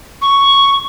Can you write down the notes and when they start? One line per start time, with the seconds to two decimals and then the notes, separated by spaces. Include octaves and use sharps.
0.22 C#6